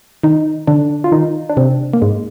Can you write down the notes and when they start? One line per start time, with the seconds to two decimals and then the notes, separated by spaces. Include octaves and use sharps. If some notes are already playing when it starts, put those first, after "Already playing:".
0.23 D#3 D#4
0.67 D3 D4
1.04 F4
1.12 D#3 D#4
1.50 D4
1.57 C3 C4
1.94 A#3
2.02 G#2 G#3